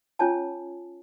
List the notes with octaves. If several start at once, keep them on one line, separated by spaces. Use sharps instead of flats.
C#4 F4 C#5 G#5 A5